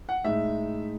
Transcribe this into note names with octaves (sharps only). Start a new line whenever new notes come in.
F#5
A2 G#3 D#4 E5